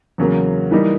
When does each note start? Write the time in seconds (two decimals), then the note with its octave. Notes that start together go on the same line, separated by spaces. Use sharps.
0.18 E2 C#3 F#3 A#3
0.71 E3 G3 A#3 D#4